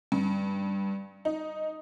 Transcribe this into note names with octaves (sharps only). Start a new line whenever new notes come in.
G2
D#4